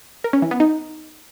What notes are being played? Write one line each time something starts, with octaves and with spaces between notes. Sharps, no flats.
A#4
C#4
E3
B3
D#4